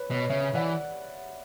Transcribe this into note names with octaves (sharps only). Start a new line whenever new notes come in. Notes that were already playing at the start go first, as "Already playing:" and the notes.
Already playing: B4 C#5
B2 C#5
C#3 C#5 E5
E3 D5 F#5